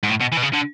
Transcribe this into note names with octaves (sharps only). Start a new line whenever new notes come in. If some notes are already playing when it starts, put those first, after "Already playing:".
G#2
A2
B2
E3
B2
C#3
D3